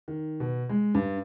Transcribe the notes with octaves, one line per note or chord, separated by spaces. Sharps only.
D#3
B2
G#3
G2